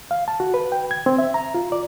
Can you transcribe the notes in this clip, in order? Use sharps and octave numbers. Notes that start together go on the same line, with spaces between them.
F5
A5
F#4
B4
G5
G#6
C4
E5
A#5
F4
D5